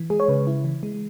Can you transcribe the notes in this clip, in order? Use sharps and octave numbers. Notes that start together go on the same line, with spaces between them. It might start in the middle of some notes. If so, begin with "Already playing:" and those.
Already playing: E3
G#3 G#4
C#5
C#3 B4
E4
E3
G#3